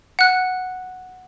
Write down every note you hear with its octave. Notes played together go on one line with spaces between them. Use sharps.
F#5 F#6